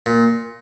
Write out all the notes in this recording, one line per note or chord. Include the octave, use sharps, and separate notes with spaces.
A#2